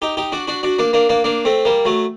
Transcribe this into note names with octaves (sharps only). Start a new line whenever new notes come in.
D#4 G4
D#4 G4
D4 F#4
D4 F#4
D4 F#4
A#3 D4
A#3 D4
A#3 D4
A#3 D4
A3 C4
G3 A#3
F#3 A3